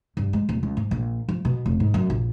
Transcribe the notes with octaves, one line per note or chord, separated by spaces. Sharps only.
G2
G#3
D1
C#2
G#2
A#1
F3
B2
F1
G#2
F#2
A#1